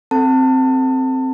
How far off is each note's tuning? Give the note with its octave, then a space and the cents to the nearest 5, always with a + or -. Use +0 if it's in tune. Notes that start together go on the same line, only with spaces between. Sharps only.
C4 +0 A4 +0 A5 +30